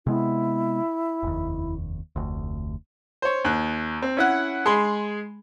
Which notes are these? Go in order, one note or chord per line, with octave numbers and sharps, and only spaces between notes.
C3 G#3 B3 E4
F1 D#2
F1 D2
C5 C#5
D#2 F#6
C4
C#4 E4 F#5
G#3 G#4 B5 C6